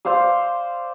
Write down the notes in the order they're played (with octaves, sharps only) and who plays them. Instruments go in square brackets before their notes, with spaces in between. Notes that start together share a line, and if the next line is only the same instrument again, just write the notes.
[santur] C5 D5 F5 E6